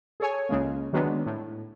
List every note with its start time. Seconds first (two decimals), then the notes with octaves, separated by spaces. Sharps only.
0.20 G#4 A4 C#5 G#5
0.49 C#2 C#3 G#3 A#3
0.93 D#3 F#3 G#3 B3 D4
1.26 A2